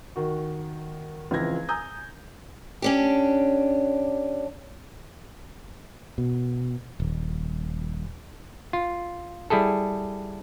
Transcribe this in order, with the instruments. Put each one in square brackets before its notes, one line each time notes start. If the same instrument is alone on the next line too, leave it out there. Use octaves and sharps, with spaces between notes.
[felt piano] D#3 F#4
C#2 E3 F3 C4 G#6 A#6
G#5 A#5 D#6 G6
[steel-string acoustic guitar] C#4 D4 G4
[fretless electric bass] B2
D#1
[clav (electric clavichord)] F4
G3 E4 G#4 A4